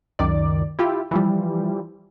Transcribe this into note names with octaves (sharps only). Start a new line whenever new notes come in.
C#2 F#2 D#3 D5
E4 F4 G4
E3 F3 G3